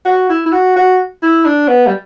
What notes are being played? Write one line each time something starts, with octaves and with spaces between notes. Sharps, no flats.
F#4
E4
E4
F#4
F#4
E4
D4
B3
G3